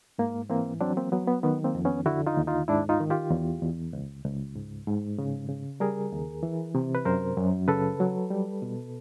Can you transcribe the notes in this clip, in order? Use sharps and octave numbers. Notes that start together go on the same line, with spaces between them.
G#2 A#3
E3 A#3 C4
F#3 C4 D4
A#3 C4
F#3 B3
B3
D#3 B3
A#3 C4
F2
B3 C#4
D3 E4 F#4
D#4 F4
D#2
D#4 F4
G#2 D4 E4
D#4 F4
D#3
F4 G4
E2
E2
C#2
C#2
G#2
G#2
C#3
C#3
G3 G#4 A#4
D#2
E3
C3
B4
F#2 A#4 C5
F#2
C#3 A4 B4
F#3
G3
B2